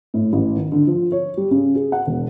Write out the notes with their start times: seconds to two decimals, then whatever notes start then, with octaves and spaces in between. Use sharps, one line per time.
0.14 A2
0.33 A1
0.57 D#3
0.72 D3
0.87 F3
1.12 C#5
1.37 G3
1.51 C#3
1.75 G#4
1.92 F#5
2.07 E1